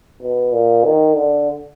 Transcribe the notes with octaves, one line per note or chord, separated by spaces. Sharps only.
B2
A#2
D#3
D3